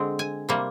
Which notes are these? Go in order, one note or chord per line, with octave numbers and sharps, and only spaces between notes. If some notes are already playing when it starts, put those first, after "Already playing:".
Already playing: D3 G#3 C4
G#5
C3 G3 A#3